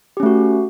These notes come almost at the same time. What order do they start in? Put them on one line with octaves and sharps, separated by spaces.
G4 C#4 A3 F#4